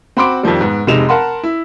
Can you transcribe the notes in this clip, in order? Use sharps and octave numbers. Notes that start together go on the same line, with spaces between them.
C4 F#4 B5 C6 D6 D7
F2 D#3 F3 G3
G#2 B3
F1 C3 G#3 D#4 E7 F7
A#4 F#5 A5 B5 C6
E4